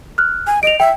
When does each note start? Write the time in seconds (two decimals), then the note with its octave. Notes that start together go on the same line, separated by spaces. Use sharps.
0.18 F6 F#6
0.47 G#5
0.63 D#5 D7 F7
0.80 E5 G5